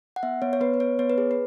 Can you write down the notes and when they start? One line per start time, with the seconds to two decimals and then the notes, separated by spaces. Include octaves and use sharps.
0.16 F#5
0.23 B3 E5
0.42 B3 C#5
0.53 C#5
0.61 B3 B4
0.74 B4
0.80 B3 C#5
0.99 B3 C#5
1.10 B4
1.18 G#4
1.31 B4